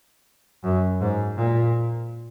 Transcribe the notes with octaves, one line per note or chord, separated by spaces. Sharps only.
F#2
G#2
A#2